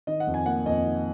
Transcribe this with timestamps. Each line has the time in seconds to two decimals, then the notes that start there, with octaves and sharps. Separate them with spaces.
0.07 D#3 D#5
0.20 F#5
0.27 F2
0.34 G#5
0.46 A#3 F#5
0.66 F2 D#5
0.85 D#3